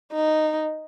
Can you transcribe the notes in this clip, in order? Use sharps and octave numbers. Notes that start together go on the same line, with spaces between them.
D#4